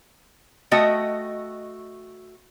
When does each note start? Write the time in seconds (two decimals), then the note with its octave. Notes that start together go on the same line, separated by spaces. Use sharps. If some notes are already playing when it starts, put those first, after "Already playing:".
0.71 A3 F#4 D#5 E5 G5